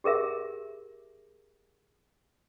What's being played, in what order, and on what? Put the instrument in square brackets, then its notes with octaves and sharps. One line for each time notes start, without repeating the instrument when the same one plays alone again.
[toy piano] G4 G#4 A#4 E5